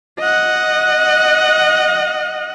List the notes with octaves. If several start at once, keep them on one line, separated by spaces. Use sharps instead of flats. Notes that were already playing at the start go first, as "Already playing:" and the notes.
D#5 F#5